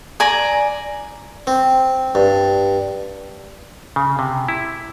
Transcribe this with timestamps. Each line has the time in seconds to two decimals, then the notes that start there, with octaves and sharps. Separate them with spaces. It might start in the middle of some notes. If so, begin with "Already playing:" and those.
0.20 D5 G#5 A#5
1.47 C4
2.15 G2
3.96 C#3
4.19 C3
4.48 E4